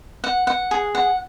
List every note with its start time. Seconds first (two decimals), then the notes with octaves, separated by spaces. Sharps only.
0.24 F#5
0.47 F#5
0.71 G#4
0.95 F#5